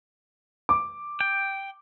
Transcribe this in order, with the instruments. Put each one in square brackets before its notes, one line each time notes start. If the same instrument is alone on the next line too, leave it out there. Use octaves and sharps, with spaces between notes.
[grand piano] D6
[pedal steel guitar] G5